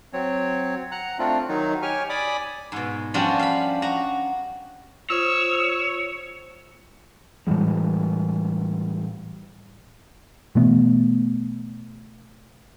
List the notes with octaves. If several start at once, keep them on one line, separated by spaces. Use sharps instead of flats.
F#3 C4 C#5
F#5 A#5 F#6
A3 C4 D4 F4
D#3 F#3 D#4
G4 C#5 G#5 C#6 F6
D5 G#5 B5 D6 D#6
G#2 B2
F3 G3 C#4 D4 F4 F#4
F5 B5
F#4 A#5
F4 C5 C#5 E6
A2 E3 G3 G#3
B2 E3 A3 B3